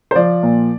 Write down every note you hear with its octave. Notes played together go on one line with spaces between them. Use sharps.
C5
F3 D5
A#2